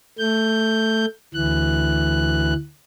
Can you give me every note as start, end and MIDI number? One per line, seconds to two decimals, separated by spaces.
0.19 1.06 57
0.19 1.06 91
1.34 2.53 38
1.34 2.53 52
1.34 2.53 90